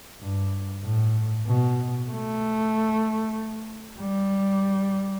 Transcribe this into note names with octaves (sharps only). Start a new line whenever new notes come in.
G2
A2
B2
A3
G3